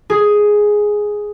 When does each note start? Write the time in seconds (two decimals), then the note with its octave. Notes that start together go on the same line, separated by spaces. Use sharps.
0.10 G#4